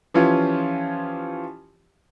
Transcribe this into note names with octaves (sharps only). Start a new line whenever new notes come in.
E3 F3 C#4 F4 G4